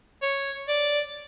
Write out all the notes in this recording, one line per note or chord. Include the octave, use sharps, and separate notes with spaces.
C#5
D5